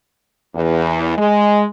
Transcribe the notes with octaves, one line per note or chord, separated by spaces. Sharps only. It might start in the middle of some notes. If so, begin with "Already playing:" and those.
E2
G#3